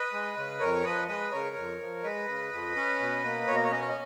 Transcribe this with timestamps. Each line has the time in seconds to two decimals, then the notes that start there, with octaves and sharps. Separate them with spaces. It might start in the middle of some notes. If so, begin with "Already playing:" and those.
Already playing: B4 D#5
0.13 G#3
0.37 C#3
0.60 F2 A#4 C#5
0.84 F3 B4 D#5
1.08 G#3 B4 D#5
1.32 C#3 A#4 C#5
1.56 F2
1.81 F3
2.03 G#3 B4 D#5
2.28 C#3
2.51 F2
2.76 C#4
3.00 B2
3.24 A#3
3.48 B2 C#5
3.56 D#5
3.64 C#5
3.71 C#4 D#5
3.81 C#5
3.89 D#5